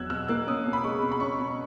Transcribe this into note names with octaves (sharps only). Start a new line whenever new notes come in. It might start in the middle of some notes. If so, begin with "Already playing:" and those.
Already playing: E2 F#3 E6 F#6 G#6
B2 E6
A#3 F#6
C#4 D#6
B2
B5
G#3 C#6
B2
B5
C#4 C#6
B2